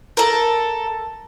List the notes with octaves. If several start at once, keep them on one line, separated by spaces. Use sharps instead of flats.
A4 A#4